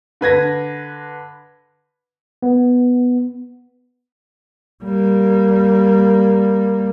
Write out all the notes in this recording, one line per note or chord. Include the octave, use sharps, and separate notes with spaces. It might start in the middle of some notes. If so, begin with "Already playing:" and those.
D3 B4 G#6 A#6
B3
G3 A#3